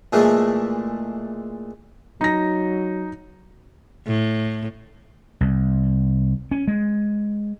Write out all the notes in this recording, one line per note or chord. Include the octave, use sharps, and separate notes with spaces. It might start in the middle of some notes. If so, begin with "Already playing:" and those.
A#2 E3 G#3 A3
F#3 D#4 A#6
A2
C2
C#4
G#3